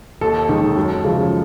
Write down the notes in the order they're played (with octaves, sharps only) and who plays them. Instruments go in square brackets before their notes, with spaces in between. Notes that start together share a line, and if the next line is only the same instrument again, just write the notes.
[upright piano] D#2 A4
D#3 G#3
F#2
C#3 F3 G#3